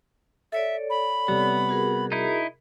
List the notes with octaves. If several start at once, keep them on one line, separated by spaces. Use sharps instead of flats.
A4 C#5 D5 E5
B5
C3 G3 B3
F#4 G#4 A#4
D#4 E4